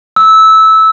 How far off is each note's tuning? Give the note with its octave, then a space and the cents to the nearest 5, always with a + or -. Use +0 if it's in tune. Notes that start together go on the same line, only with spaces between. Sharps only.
E6 -15